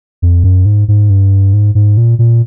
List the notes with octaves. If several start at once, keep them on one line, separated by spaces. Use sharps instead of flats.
F2
F#2
G#2
G#2
G2
G#2
G#2
A#2
A#2